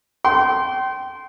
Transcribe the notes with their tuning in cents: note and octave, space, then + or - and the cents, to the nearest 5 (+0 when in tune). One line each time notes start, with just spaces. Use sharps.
G5 -30 C6 +0